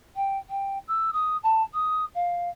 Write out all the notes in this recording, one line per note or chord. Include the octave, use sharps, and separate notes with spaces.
G5
G5
E6
D#6
A5
D#6
F5